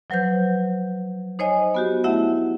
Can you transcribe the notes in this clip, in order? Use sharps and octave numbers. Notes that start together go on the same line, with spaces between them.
F3 F#3 B4 C5 G6
D#4 C5 C#5 D#5 G#5
B3 F#4 G4
A3 E4 E5 F#5